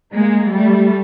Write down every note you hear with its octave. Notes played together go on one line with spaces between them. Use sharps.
G#3 A#3
G3 A3